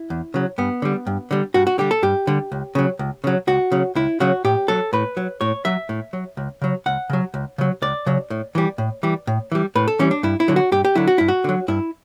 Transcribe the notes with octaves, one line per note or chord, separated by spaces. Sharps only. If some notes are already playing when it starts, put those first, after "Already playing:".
Already playing: E4
E2
C#3 F#3
G2 B3
D3 G3
G2
D3 G3
G2 F#4
F#4
D3 G3 G4
A4
G2 G4
D3 G3
C#2
C#3 F#3
C#2
C#3 F#3
C#2 F#4
C#3 F#3
C#2 E4
C#3 F#3 F#4
A2 G4
F#3 A4
A2 B4
F#3
A2 C#5
F#3 E5
A2
F#3
C#2
C#3 F#3
C#2 F#5
C#3 F#3
C#2
C#3 F#3
C#2 D5
C#3 F#3
A2
E3 G3
A2
E3 G3
A2
E3 G3
A2 B4
A4
E3 G3 C#4
D4
G2 E4
E4
D3 F#3
F#4
G2 G4
G4
D3 F#3 E4
F#4
G2 E4
F#4
D3 F#3
G2 E4